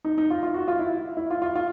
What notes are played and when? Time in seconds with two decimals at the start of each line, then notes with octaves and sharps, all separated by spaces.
0.05 D#4
0.18 D#4
0.30 F4
0.43 F4
0.54 F#4
0.68 F4
0.79 E4
1.17 E4
1.30 F4
1.42 F4
1.55 F4